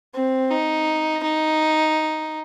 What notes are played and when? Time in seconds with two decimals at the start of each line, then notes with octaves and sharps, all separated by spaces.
0.15 C4
0.51 D#4
1.23 D#4